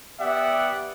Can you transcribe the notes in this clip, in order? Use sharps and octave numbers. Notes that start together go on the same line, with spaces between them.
B3 G4 D5 E5 F#5